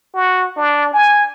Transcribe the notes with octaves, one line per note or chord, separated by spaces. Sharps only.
F#4
D4
G#5